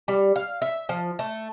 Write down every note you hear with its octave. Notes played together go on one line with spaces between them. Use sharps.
G3
F5
E5
F3
A3